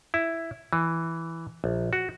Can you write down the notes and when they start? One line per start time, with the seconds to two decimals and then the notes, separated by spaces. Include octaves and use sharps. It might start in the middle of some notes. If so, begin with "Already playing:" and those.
0.14 E4
0.73 E3
1.64 A#1
1.93 F#4